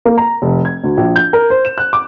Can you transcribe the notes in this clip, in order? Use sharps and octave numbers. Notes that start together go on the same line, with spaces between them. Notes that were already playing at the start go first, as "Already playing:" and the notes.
A#3
A#5
F1
G#6
D2
A#1
G6
A#4
C5
E7
F#6
D6